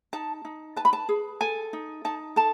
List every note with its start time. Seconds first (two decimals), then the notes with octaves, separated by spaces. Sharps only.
0.13 D#4 A5
0.45 D#4
0.76 B4 A5
0.85 B5
0.93 A5
1.09 G#4
1.41 A4 G#5
1.73 D#4
2.05 D#4 A5
2.36 A4 A5